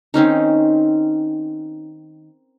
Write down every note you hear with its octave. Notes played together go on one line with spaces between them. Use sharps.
D#3 C4 C#4 D#4